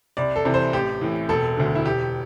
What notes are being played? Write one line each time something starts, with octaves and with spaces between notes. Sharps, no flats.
C2 D5
A4
C3 E3
C5
A1 G4
A2 E3
E1 A4
D2 D3
E4
E1 G4